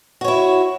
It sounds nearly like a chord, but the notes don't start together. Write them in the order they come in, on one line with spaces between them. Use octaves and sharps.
F#4 C#5 E4